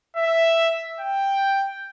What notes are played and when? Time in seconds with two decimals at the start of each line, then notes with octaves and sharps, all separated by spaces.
0.17 E5
1.00 G5